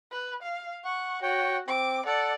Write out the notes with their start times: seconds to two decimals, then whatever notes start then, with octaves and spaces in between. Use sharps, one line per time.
0.11 B4
0.42 F5
0.84 F#5 C#6
1.22 F#4 C#5 G5
1.68 C4 D6
2.06 A4 D5 F#5